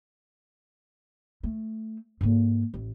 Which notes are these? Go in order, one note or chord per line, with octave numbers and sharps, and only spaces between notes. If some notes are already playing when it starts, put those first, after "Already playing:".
A3
G#2 A#3
A1